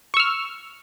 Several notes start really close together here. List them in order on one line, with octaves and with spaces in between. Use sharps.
C#6 E6 F6